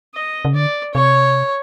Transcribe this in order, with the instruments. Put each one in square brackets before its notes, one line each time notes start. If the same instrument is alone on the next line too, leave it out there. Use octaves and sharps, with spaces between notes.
[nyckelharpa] D#5
[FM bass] C#3
[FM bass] D3 [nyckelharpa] D5
[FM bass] C3 [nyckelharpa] C#5